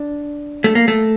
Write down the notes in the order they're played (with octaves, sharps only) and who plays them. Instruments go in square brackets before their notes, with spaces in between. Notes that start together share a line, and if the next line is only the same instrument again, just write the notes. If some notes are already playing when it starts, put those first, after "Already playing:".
Already playing: [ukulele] D4
[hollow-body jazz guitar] A3
A#3
A3